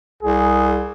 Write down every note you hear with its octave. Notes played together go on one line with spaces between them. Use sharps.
C2 G#4